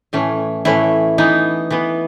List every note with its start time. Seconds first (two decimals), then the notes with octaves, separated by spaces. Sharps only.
0.13 A2 E3 A3 C#4
0.65 A2 E3 A3 C#4 E4
1.18 E3 B3 D#4
1.70 E3 B3